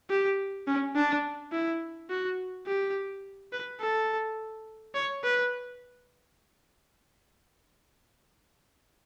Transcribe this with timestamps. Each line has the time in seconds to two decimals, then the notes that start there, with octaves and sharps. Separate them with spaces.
0.10 G4
0.67 C#4
0.96 D4
1.52 E4
2.10 F#4
2.67 G4
3.52 B4
3.81 A4
4.95 C#5
5.24 B4